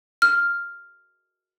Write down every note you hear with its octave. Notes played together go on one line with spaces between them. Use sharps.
F6